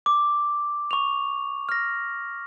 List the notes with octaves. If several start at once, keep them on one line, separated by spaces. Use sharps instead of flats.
D6
C#6 F7
F6 A#6